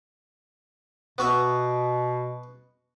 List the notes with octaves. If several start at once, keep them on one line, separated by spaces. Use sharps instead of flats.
B2 B3 F#4 E5